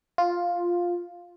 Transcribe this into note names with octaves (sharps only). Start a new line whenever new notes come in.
F4